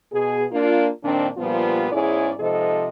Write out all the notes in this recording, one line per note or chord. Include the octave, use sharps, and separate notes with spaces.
B2 G#4
A#3 D4 F4
F2 A#2 D#3 C4 D4
G2 A#2 F3 G3 B3 F4
E2 G#2 C#4 E4 G#4 D5
G#2 C3 F3 A4 D#5